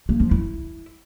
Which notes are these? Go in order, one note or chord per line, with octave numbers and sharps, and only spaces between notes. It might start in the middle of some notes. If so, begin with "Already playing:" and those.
A#3
F3
E4